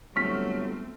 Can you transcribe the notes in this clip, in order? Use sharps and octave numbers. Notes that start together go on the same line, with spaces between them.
G1 F#3 A3 C4 C#6 F6 B6